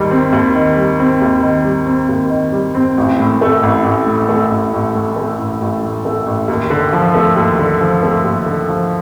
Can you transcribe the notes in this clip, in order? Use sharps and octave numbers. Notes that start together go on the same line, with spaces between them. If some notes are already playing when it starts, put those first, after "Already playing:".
Already playing: D#2 D#3 G3
C4
D#2
D#3
G3
C4
D#2
D#3
G3
C4
D#2
D#3
G3
C4
A1
A2
A3
A1
A1
A2
A3
A1
A1
A2
A3
A1
A1
A2
A3
A1
D#2
D3
F3
A3
D#2
D3
F3
A3
D#2
D3
F3